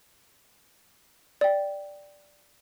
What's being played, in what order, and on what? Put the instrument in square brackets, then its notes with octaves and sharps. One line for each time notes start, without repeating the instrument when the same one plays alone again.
[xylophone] D5 G5